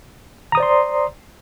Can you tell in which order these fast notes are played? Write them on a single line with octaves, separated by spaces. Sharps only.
A#5 D#6 C5 D5 C6